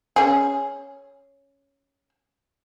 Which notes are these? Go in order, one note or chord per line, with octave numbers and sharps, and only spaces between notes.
C#4 G#4